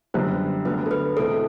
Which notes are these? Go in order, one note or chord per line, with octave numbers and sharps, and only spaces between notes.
F#2 D3 G3 B3 C5
D2 D3 F#3 B3 B4
A4
B4
E2 B2 A3 C4 A4